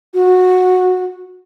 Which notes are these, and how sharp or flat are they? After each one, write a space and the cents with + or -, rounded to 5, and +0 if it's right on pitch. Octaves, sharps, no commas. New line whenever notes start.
F#4 -15